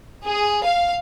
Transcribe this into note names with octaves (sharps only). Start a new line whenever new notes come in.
G#4
F5